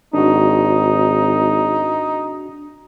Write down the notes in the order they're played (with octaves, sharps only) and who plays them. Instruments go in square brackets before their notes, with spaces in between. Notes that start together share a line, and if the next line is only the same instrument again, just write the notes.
[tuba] G#1 [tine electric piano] D4 F#4 [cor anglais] D#4